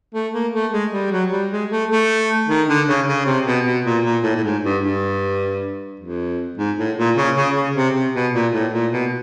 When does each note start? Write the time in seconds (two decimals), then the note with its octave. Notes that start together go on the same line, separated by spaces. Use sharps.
0.14 A3
0.34 A#3
0.53 A3
0.72 G#3
0.93 G3
1.11 F#3
1.31 G3
1.51 G#3
1.71 A3
1.90 A3
2.48 D#3
2.68 D3
2.88 C#3
3.07 C#3
3.26 C3
3.46 B2
3.65 B2
3.84 A#2
4.04 A#2
4.23 A2
4.36 A2
4.44 G#2
4.63 G2
4.82 G2
6.00 F2
6.58 G#2
6.78 A2
6.97 A#2
7.16 C#3
7.36 C#3
7.55 C#3
7.75 C3
7.94 C3
8.14 B2
8.33 A#2
8.53 A2
8.73 A#2
8.92 B2